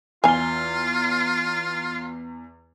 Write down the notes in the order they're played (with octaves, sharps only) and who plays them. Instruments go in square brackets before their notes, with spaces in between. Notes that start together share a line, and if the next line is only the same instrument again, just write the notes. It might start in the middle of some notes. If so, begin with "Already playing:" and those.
[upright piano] E2 F6 G7 [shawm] F4 [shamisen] F5 G#5